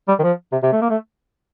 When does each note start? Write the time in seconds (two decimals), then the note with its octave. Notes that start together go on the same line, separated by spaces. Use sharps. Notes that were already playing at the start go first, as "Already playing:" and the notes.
0.08 G3
0.19 D#3
0.23 F3
0.52 C3
0.63 C3
0.73 A3
0.82 A#3
0.90 A3